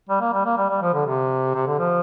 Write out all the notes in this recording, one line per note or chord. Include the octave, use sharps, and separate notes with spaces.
G3
A#3
G3
A#3
G3
G3
F3
D3
C3
C3
D3
F3